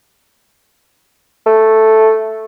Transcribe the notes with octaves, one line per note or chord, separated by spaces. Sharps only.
A3